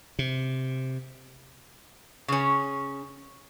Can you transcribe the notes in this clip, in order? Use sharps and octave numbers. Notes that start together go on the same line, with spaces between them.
C3
C#3 C#4